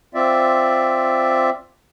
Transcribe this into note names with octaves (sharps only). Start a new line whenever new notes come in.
C4 F4 D5 E5